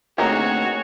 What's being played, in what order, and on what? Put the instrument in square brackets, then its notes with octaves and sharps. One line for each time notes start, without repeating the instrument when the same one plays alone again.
[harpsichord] D2 A#3 C4 [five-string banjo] D#4 G#4 [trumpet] F#4 [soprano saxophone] C#5